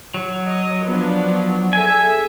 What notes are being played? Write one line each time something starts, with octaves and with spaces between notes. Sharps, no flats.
F#3
D#5
F3 B3 D4
G#4 A4 E5 G#5